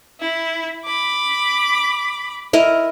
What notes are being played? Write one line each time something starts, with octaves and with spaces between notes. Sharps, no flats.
E4
B5 D6
E4 A#4 D#5